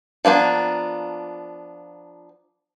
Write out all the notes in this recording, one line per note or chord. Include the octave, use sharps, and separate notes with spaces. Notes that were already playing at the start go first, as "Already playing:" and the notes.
F3 A#3 B3 D4